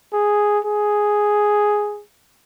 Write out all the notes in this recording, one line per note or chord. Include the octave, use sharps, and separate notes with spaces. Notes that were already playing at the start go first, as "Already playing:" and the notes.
G#4
G#4